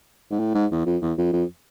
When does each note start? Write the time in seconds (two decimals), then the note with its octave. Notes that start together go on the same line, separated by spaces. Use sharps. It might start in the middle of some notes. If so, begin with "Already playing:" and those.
0.31 G#2
0.39 A2
0.55 G#2
0.71 E2
0.86 F2
1.02 E2
1.17 F2
1.33 F2